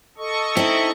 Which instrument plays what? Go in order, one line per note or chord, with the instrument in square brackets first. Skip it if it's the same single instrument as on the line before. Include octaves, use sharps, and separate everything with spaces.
[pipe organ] A4 D#5 C#6
[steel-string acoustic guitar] C4 D#4 [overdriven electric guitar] E4